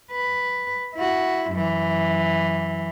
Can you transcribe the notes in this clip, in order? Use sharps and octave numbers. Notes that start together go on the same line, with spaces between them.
B4
E4 F#4
F#2 E3